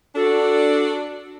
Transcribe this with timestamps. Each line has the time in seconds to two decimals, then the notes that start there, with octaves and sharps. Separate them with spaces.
0.16 D4 F#4 A4